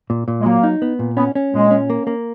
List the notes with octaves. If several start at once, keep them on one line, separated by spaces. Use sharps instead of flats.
A#2
A#2
G#3
F#3 A#3
D#4
B3
A#2
B3 C#4
C#4
A#2 G#3
C#4
A#3
A#3